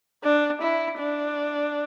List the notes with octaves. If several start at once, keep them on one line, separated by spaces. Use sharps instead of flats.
D4
E4
D4